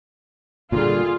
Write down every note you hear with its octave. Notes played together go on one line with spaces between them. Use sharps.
A#2 D3 G3 F4 G#4